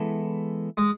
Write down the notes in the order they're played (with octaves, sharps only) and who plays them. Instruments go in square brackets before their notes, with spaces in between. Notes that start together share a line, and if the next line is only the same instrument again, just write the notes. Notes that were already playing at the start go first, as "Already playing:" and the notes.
Already playing: [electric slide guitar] E3 G#3 B3 E4 A4
[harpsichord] G#3